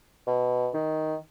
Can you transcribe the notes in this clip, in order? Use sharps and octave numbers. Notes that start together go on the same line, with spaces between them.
B2
D#3